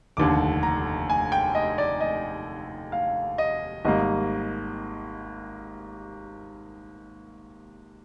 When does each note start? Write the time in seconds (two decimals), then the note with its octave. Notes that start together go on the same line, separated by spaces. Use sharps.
0.17 F1 D#2 D3 D6
0.63 A#5
1.10 G#5
1.32 G5
1.55 D#5
1.78 D5
2.01 D#5
2.92 F5
3.38 D#5
3.85 G#1 G#2 G3 A#3 D#5